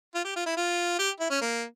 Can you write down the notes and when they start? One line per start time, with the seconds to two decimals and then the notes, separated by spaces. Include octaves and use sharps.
0.14 F4
0.24 G4
0.36 F4
0.46 E4
0.56 F4
0.98 G4
1.20 E4
1.30 C#4
1.41 A#3